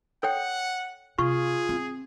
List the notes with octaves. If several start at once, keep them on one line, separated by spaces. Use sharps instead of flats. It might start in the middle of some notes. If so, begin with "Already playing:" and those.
A4 C#5 F#5 G5
C3 F4 G#4 C#6
C4